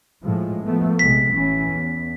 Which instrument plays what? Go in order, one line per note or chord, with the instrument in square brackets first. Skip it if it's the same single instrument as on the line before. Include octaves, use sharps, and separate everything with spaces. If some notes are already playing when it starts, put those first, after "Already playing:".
[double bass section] A2 F3 G#3
F3 A3 B3
[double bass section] A#1 C3 G#3 [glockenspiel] B6
[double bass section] A1 E3 C#4
E2